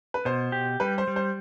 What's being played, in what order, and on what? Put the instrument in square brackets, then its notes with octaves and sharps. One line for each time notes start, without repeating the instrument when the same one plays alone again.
[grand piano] B4
[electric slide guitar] B2 [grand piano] C5
[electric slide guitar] G4
[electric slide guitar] G3 [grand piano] B4
[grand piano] C5
[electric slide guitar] G3
[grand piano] C5